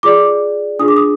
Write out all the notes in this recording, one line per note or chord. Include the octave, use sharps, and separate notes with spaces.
F4 G#4 D5 D6
D4 F4 G#4 D#6
D6
D#6